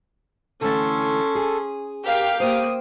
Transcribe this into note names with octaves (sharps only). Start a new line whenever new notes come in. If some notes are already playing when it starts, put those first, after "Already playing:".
D3 E3 A3 C#4 A4 C6
G#4
G4 A#4 F5 B6
A#3 C5 G5 D#6